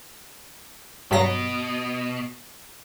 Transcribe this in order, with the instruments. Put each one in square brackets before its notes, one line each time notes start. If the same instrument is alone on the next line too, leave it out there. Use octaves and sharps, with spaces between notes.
[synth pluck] G2 F#3 A#6 [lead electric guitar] B2